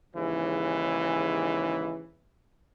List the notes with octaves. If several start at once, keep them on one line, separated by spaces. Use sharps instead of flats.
D#2 G#2 C#3 E3